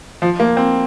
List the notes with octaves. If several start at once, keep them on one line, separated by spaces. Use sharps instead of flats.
F3
A#3
C4